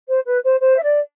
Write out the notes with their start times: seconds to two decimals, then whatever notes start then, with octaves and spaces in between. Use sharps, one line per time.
0.08 C5
0.26 B4
0.43 C5
0.60 C5
0.78 E5
0.83 D5